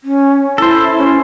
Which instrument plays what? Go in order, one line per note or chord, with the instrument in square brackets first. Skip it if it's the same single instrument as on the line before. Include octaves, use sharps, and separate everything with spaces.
[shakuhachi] C#4
[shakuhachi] E4 [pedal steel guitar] A4 C5
[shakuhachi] C#4